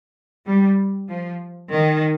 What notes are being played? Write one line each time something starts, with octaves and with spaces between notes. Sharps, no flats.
G3
F3
D#3